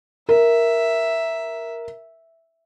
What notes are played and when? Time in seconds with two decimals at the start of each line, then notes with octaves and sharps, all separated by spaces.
0.29 A#4 E5